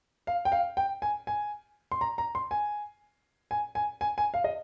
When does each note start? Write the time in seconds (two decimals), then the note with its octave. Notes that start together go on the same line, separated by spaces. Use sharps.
0.27 F5
0.45 G5
0.52 F5
0.77 G5
1.02 G#5
1.27 G#5
1.92 C6
2.01 A#5
2.18 A#5
2.35 C6
2.51 G#5
3.51 G#5
3.75 G#5
4.01 G#5
4.18 G#5
4.34 F5
4.44 D#5